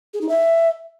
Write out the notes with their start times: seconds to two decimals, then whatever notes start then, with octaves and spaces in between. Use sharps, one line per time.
0.14 G#4
0.21 D#4
0.29 E5